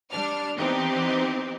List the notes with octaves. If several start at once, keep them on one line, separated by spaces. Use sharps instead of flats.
G3 D4 F6
E3 B3 C4 D#4 G4